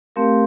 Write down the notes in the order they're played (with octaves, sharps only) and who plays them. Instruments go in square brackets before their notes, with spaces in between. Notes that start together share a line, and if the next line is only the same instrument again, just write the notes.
[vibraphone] A3 C4 G4 A#4 F5